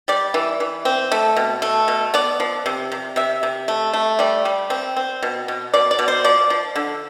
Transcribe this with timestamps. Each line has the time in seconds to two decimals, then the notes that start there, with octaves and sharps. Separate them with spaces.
0.08 G3 D5
0.34 E3
0.60 E3
0.85 C4
1.12 A3
1.36 B2
1.62 A3
1.88 B2
2.14 B3 D5
2.40 F3
2.66 C3
2.92 C3
3.16 C3 E5
3.43 C3
3.68 A3
3.93 A3
4.19 G3 D5
4.45 G3
4.70 C4
4.96 C4
5.22 B2
5.48 B2
5.74 B2 D5
5.91 D5
5.99 B2
6.08 C5
6.24 F3 D5
6.50 F3
6.75 D3